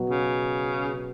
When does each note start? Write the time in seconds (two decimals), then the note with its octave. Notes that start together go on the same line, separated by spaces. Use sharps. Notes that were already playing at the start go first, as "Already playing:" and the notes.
Already playing: B2 F#3 B3 F#4
0.10 C#3